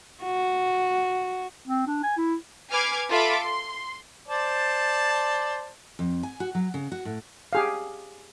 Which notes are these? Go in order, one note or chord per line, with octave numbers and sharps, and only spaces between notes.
F#4
C4
D4
G#5
E4
B4 G#5 D6 F6 G#6 C7
F4 A4 E5 B5 D6
C6
C5 D5 A5
F2
G#5
F#4
F#3
C#3
F#4
A2
G4 G#4 F5